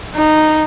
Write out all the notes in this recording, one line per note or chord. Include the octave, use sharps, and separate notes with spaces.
D#4